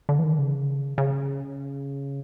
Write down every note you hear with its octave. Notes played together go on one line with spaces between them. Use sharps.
D3
E3
D#3
C#3
C#3